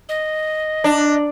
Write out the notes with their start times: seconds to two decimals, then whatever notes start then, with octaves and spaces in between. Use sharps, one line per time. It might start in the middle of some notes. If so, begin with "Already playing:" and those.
0.09 D#5
0.84 D4